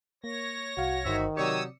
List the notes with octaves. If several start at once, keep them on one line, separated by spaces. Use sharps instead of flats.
A#3 C#5 A#6
C2 F#4 F5
G1 D#3 D#4 F#4 C5 E5
C3 F#3 G4 C#5 D5 D#6 E6 C#7